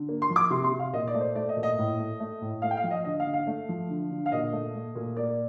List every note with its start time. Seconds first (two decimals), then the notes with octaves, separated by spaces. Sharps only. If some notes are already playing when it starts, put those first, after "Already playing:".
Already playing: D3
0.09 A#3
0.22 C6
0.30 F3
0.36 D6
0.50 C3 C6
0.64 C6
0.71 C3
0.79 F5
0.94 A#2 D#5
1.07 D5
1.15 A3
1.21 C5
1.35 A3 D5
1.49 D#5
1.56 A#2
1.63 D#5
1.78 A2
1.99 A3
2.20 A3
2.41 A2
2.62 A3 F5
2.71 G5
2.77 F5
2.83 F3
2.91 D#5
3.05 D3 D#5
3.20 F5
3.26 D3
3.34 F5
3.47 A3
3.69 F3
3.90 D3
4.11 D3
4.26 F5
4.32 A#2 D#5
4.53 A3
4.75 A3
4.95 A#2
5.16 A#3 D5